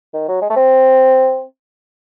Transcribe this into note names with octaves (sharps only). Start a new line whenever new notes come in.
D#3
F#3
G#3
A3
C4